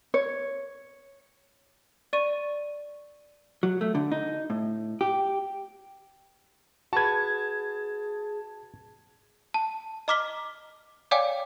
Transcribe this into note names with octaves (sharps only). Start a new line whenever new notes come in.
C#5
D5 C#6 D#7
F#3
A3
D3
D#4
A2
G4
F#4 G#4 B4 A5 G#6
A5
D#5 A#5 D6 F6 B6 G7
C#5 D5 F5 G5 G#5 D6